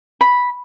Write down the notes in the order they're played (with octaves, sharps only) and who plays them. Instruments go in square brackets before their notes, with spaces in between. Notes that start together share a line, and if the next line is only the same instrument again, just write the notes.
[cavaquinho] B5